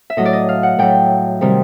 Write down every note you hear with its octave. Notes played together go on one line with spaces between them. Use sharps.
E5
A2 F#3 A3 D#5
D5
D#5
F5
F#5
A2 F#3 A3 G5
C3 D#3 G3